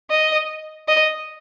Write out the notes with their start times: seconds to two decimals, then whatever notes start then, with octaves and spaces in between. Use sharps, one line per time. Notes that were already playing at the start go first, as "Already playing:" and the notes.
0.10 D#5
0.88 D#5